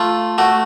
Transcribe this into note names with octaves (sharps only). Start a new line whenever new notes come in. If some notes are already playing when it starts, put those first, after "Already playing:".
Already playing: A3 F4
A3 F#4